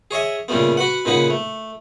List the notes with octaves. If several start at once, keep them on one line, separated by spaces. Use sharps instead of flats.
G#4 C#5 D#5 E5
A#2 C#3 G3 A3 B3
F#4 B4 F#5
A#2 C#3 D#4 B4 F#5
A3